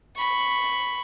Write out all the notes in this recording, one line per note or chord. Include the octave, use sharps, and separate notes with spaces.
B5 C#6